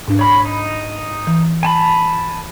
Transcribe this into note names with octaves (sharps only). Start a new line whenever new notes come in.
G#2 D4
C#5 B5
D#4
E3
G#5 A5 B5